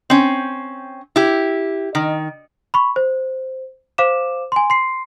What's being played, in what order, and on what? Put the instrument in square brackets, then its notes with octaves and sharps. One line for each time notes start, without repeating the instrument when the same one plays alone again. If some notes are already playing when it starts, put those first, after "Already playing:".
[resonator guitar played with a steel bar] C4 C#4
E4 G4
D#3
[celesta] B5 C#6
C5
C5 F5 D6 E7
G#5 C6
C6 C7